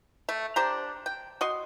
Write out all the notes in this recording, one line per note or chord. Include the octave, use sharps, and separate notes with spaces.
A3
D4 G4 C5 A#5
G5
F#4 D#5 C6